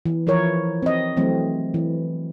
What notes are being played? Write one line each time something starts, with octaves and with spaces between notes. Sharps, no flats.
E3
E3 F3 E4 A#4 C#5
C4 D#5
E3 F#3 A3 C4
E3